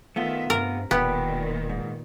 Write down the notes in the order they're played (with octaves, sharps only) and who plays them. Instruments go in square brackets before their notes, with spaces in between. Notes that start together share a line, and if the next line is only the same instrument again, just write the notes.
[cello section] D#3 E5 [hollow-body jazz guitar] A3 B3 F4
[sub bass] G2 [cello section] C3 [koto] A#4
[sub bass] E1 [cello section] A#2 D#3 [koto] B3 [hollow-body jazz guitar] G4
[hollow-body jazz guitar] G#2